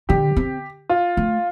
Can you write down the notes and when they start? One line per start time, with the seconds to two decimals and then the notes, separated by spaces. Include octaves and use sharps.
0.09 D3 G4
0.36 C4
0.89 F4
1.17 A3